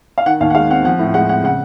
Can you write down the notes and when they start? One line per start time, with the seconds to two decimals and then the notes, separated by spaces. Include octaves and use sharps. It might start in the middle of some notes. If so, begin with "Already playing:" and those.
0.18 F5
0.26 D#3 F#5
0.40 D#2 F5
0.50 F#5
0.55 G#3 F5
0.70 C4 F#5
0.85 F3 F#5
0.99 A2
1.14 G#3 F#5
1.29 C4 F#5
1.44 C#3 F#5